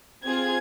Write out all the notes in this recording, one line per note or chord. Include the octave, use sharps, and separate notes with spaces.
C4 F4 G#4 G#6